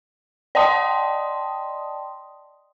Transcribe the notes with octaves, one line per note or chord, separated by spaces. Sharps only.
D5 D#5 G5 A5 C6 D#6